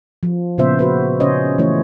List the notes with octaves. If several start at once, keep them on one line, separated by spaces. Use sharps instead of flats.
F3
A#2 C#3 B3 F4 C5 E5
F#4 B4 C5
C#3 C#4 C5 C#5 D#5
E3 A3 C#4 E4 C#5